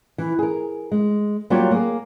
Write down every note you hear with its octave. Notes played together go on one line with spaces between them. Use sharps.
E3
G#4 A#4
G#3
F#3 G3 A#3 F4 G4 C#5
A#3 G#4